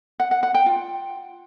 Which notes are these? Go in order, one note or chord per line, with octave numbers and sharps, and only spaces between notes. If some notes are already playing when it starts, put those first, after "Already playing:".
F#5
F#5
F#5
G5
F4